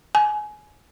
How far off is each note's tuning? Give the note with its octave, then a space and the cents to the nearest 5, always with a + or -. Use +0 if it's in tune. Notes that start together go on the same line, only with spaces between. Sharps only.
G#5 +20